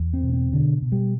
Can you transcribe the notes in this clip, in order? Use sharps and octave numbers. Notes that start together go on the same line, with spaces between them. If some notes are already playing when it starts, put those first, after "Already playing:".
Already playing: E2
C4
B2
C4
B2 D3
B2
G3